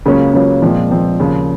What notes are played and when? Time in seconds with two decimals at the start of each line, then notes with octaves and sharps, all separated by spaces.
0.06 C#2 C#3 F#3 A#3 C#4
0.34 C#2 C#3 F#3 A#3 C#4
0.62 A#2 F3 G#3 C4
0.90 A#2 F3 G#3 C4
1.19 D#2 C#3 F3